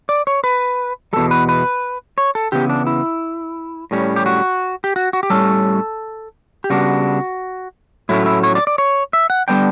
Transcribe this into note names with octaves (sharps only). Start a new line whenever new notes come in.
D5
C#5
B4
E2 B2 G3 A4
B4
B4
C#5
A4
C#3 E3 B3 G4
D4
E4
A2 G3 C#4
G4
F#4
G4
F#4
F#4
G4
A2 G3 C#4 A4
G4
C#3 G3 B3 D4 F#4
A2 F#3 A3 C#4 E4
E4
C#5
D5
D5
C#5
E5
F#5
D3 G3 B3 D4 G5